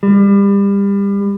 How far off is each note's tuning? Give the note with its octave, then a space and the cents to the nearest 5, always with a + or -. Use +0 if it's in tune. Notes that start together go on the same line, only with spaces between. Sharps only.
G3 +30